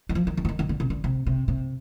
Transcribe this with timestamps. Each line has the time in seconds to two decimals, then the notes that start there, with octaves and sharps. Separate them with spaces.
0.09 D#3
0.15 F3
0.27 D#3
0.37 D#3
0.45 F3
0.49 D#3
0.59 D#3
0.69 D3
0.80 C3
0.90 D3
1.04 C3
1.26 C3
1.48 C3